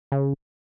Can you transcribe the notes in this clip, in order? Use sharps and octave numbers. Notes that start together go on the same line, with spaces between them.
C#3